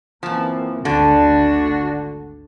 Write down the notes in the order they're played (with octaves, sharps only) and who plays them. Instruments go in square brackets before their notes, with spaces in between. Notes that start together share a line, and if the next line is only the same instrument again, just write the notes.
[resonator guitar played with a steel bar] F#2 F3 [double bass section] E3 A#3 C4
[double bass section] G#1 D2 [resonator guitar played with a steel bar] D3 [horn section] D4 F#4